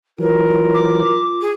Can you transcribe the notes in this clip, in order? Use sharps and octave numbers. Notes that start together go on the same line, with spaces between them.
E3 F#3 F4 A#4
D6
G#4